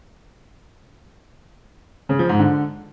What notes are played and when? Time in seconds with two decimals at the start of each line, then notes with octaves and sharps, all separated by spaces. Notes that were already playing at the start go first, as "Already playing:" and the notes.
2.09 C#3
2.19 F3
2.29 G#2
2.39 D3